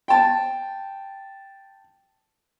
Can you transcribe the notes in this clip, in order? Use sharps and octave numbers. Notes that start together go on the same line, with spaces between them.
G5 A5